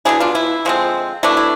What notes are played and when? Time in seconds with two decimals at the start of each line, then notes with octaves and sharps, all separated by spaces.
0.05 B2 A3 D4 E4 G#4
0.20 D4 F4
0.35 E4
0.65 D3 F3 G#3 C4
1.23 B2 A3 D4 E4
1.37 E4